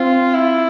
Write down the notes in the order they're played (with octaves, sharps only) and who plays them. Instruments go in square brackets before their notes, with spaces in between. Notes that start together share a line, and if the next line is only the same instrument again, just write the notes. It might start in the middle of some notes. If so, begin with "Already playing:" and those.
Already playing: [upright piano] C4 [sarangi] F4
[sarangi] E4